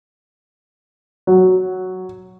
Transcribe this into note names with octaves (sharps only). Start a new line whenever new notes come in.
F#3